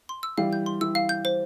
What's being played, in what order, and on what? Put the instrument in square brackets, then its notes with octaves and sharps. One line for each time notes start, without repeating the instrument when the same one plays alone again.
[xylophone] C6
E6
[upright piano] E3 G3 [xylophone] F5
[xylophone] G6
C6
[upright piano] E3 [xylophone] E6
[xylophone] F5
G6
C5